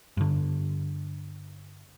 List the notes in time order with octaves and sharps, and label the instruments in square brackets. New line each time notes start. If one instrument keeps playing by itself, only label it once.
[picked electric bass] G2 D3